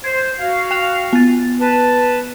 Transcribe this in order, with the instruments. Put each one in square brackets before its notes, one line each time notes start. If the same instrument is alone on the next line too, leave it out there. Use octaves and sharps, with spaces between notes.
[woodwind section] C5 [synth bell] G#6
[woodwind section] F#4 F5
[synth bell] G5 F#6 F7
B3 A6
[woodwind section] B4 A5